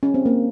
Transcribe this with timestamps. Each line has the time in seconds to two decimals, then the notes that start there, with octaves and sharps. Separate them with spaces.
0.03 C#4
0.14 C4
0.26 A#3